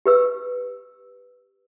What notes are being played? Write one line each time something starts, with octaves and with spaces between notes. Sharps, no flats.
G4 B4 E6